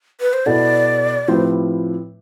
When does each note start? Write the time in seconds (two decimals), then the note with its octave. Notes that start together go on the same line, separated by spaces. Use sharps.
0.21 B4
0.33 C5
0.46 B2 B3 E4 A4 D5
1.28 A2 F3 C4 G4 B4 C5